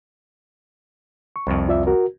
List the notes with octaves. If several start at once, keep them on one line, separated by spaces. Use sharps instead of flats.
C#6
C2 F2
F4 D5 E5
F#4 A#4